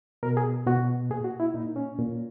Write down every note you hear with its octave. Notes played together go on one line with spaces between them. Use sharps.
B2 A#4
G#4
B2 F#4
A#2 G#4
F#4
E4
A#2 D#4
C#4
A#2